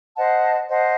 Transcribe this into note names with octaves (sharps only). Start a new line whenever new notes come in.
C5 D#5 F#5 A5
C5 D#5 F#5 A5